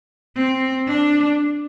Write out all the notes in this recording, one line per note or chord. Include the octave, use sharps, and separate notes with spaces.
C4
D4